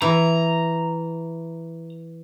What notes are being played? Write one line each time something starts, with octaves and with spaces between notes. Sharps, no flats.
E3 A#5